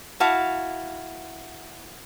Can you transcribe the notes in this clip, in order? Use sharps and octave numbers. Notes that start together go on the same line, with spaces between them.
E4 F#4 F5 A5